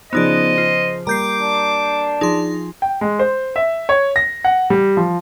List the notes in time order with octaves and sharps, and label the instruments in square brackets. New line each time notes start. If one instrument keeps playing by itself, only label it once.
[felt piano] C#3 F3 G#4 [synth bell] B3 D#4 D5 [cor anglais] C5 [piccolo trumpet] D#5
[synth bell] F4
[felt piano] G3 A#3 [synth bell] A#5 G6 C7 [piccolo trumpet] D6
[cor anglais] D4
[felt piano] F3 G#4 [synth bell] D#4 C6
[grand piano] G5
G#3
C5
E5
C#5
A#6
F#5
G3
F3